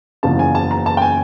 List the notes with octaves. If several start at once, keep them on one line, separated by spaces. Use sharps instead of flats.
F#1 E2 C#3 F3 A5
G#5
A5
A#5
A5
G5
G#5